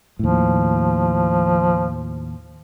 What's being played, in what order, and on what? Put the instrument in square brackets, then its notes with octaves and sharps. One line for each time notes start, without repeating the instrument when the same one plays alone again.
[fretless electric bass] D#2 A2 [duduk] F3